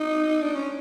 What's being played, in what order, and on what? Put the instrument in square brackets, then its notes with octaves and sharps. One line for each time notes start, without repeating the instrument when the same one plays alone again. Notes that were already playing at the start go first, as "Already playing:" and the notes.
Already playing: [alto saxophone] D#4
D4
C#4